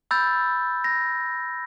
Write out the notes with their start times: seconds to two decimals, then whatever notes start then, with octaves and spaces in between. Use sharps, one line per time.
0.11 B5 E6 G6 A6
0.84 A#6